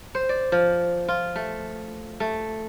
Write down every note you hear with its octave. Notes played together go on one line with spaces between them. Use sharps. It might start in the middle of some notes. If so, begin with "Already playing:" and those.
C5
D5
F3
F4
A3
A3